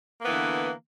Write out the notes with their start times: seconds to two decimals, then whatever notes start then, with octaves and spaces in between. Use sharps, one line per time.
0.21 A#3
0.24 B3
0.27 E3
0.30 D3